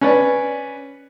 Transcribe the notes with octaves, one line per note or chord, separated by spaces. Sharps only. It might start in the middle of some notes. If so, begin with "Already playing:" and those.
C#4 B4 D5